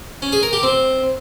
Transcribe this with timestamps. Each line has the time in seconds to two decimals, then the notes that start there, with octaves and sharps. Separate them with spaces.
0.22 C#4
0.33 G#4
0.43 A#4
0.53 G4
0.63 C4